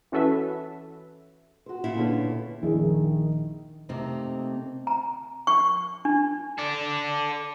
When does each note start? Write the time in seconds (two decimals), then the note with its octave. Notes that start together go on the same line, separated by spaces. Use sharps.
0.12 E3 C#4 F#4 A4 B4 E5
1.66 F#4 C5
1.84 A#2 E4
1.96 D3 B3 C#4
2.63 A#1 D#3 E4 G#4
3.89 C3 A3 A#3 C4 D#4
4.87 A#5
5.47 C#6
6.05 D4
6.58 A4 D5